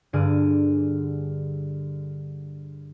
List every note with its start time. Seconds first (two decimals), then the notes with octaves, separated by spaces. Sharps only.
0.13 G2 D3 G#4 D6 F6 D#7